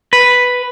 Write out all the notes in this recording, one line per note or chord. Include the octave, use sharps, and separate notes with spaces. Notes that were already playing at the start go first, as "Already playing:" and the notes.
B4